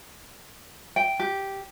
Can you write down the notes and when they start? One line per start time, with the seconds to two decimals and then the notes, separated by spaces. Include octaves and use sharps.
0.96 G5
1.20 G4